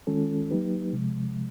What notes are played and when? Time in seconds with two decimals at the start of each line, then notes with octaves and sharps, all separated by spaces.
0.07 D#3 G#3 C#4 F4 A4
0.51 F#3 A#3 D#4 G4 B4
0.93 C3 F3 G#3